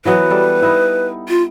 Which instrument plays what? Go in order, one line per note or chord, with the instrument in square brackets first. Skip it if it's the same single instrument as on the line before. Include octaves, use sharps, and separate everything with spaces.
[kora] E3 F#3 B3 [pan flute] B4
[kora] G3 A4
B3 D#4 E4
[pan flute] F4